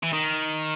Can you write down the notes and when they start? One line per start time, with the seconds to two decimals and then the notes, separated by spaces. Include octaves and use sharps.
0.03 E3
0.13 D#3